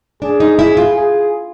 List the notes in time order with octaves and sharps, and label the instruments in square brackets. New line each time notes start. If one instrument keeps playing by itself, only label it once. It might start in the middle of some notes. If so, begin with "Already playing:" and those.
[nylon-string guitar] D4 [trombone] G#4
[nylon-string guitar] D#4
[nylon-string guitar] E4 [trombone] G#4
[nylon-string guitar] F4
[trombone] G#4